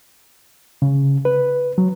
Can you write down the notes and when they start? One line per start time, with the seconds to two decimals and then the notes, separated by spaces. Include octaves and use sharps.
0.82 C#3
1.25 B4
1.78 F#3